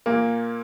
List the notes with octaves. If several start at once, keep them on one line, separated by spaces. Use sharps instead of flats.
A#2 A#3